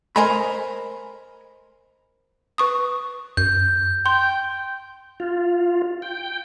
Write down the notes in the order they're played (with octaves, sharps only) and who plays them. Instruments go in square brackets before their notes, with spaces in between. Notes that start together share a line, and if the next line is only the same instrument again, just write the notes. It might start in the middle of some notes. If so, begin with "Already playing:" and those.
[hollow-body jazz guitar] A#4 C5 D#5 G#5 A#5 B5
[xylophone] B4 C#6 D#6
[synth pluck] F#2 [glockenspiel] G6
[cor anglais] G5 [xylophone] C6
[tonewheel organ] F4
G5